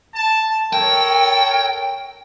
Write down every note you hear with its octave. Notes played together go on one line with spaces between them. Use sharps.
A5
A4 A#4 C#5 G5